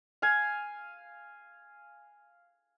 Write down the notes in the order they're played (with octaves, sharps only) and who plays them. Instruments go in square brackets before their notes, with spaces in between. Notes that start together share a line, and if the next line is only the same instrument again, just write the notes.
[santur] F5 G#5